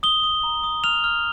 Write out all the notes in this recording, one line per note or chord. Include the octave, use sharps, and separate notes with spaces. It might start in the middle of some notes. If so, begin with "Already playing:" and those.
D#6 G7
D#6
A#5
D#6
F6 F7
F6